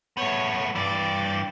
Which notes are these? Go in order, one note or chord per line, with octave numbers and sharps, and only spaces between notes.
A3 B3 C#5
G2 E3 D5